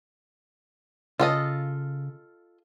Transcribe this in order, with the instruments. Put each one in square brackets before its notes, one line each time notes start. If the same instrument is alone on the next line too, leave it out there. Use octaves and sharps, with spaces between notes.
[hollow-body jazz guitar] C#3 [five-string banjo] F4 A4 D#5